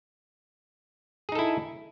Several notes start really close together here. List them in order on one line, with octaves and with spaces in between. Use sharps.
G#4 D#4 A4 E4